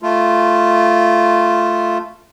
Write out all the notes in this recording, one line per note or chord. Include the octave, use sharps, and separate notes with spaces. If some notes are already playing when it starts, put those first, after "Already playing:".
A3 F4